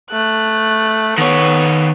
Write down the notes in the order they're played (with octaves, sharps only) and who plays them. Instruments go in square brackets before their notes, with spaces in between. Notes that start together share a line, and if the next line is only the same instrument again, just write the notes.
[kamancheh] A3 F#6
[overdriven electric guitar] D#3 C#5 [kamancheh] B3 A4